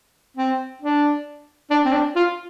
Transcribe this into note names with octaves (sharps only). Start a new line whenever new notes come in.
C4
D4
D4
C4
D4
F4